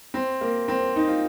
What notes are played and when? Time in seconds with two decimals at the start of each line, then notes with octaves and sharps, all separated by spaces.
0.14 C4
0.41 A#3
0.68 C4
0.96 D#4
1.08 F4